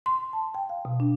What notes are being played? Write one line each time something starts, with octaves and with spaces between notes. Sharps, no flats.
C6
A5
G5
F5
B2
D4